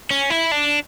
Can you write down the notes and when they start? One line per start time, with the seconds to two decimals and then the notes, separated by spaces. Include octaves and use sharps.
0.11 C#4
0.30 E4
0.51 D4